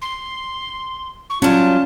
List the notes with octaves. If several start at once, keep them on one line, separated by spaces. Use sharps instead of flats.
C6
C#6
F#3 G3 C#4 F4 A5